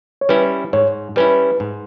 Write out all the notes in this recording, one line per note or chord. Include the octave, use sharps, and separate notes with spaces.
C#5
G3 C#4 E4 B4
G#2 C#5
G3 C#4 E4 B4
G#2